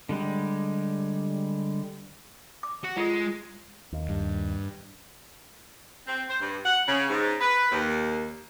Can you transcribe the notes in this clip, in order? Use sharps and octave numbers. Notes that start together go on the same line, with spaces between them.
D3 G3 G#3 G4
D6
F#4
G#3 F4 A4
D#2
G2
C4
C5
G2
F#5
C#3
G#2
B4
D#2